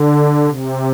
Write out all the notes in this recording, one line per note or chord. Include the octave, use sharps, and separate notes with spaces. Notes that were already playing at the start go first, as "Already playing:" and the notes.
Already playing: D3
C3